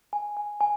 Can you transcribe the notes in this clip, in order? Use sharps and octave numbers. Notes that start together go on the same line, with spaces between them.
G#5
G#5
G#5